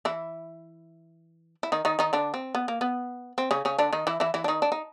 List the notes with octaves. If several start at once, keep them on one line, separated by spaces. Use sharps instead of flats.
E3 E4
E4
D#3 D#4
D#3 D#4
D#3 D#4
D3 D4
C4
B3
A#3
B3
C4
C#3 C#4
C#3 C#4
D3 D4
D#3 D#4
E3 E4
E3 E4
E3 E4
D4
D#3 D#4
D4
D#4